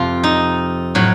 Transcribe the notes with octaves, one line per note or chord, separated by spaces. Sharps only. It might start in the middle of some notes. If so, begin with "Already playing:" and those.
Already playing: F2 C3 F3 F4
D#4
A2 F#3